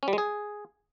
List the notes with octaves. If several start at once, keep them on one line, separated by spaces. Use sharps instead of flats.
C#4
G3
G#3
G#4